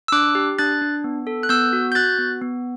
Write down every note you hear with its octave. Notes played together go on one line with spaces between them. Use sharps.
E6
D4 D6 F#6
G4
D4 F#6 A6
D4
B3
A4
F#6
B3 E6 G6
F#4
G6
F#4 F#6 A6
B3
B3